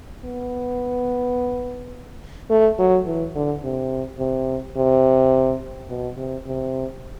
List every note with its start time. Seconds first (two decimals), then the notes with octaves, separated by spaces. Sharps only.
0.25 B3
2.50 A3
2.79 F#3
3.06 E3
3.36 D3
3.64 C3
4.19 C3
4.77 C3
5.89 B2
6.17 C3
6.46 C3